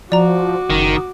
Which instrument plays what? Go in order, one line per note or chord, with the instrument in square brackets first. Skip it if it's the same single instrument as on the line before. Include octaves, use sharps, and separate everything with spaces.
[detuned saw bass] F3 [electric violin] F#4 D6 [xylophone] D5 A#5
[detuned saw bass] F#1 [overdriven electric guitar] D#3